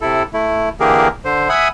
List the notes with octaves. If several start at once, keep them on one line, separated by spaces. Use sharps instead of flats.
C3 E4 A4
A3 E4
D3 E3 A#3 G4 G#4 A#4
D3 C5
E5 F#5 G#5 B5 D#6